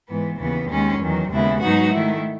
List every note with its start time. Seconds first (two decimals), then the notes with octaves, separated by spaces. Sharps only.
0.08 G#2 E3 B3
0.39 D#2 C#3 E3 B3
0.69 D#2 D#3 G#3 C#4
1.00 E2 D#3 F#3
1.30 D#2 C#3 G#3 B3 E4
1.61 G#2 F#3 B3 D#4 F#4
1.92 D#3 A3 E4